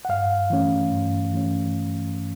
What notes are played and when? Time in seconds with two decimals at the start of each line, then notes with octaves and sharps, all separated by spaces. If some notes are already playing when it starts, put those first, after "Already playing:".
0.05 F#5
0.09 G2 F5
0.50 E3 A3 C#4
0.91 G2
1.33 E3 A3 C#4